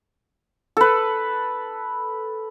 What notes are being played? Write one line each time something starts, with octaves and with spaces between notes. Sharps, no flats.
A4 B4